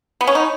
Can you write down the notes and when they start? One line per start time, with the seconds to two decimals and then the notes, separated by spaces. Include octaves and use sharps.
0.21 B3
0.27 C#4
0.35 D#4